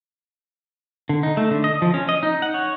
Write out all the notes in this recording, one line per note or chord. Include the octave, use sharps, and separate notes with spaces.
D3
D#4
A3
D3
D#5
F3
C#4
D#5
D#4
F#5
C#5